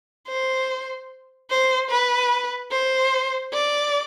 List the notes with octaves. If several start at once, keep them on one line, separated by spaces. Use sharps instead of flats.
C5
C5
B4
C5
D5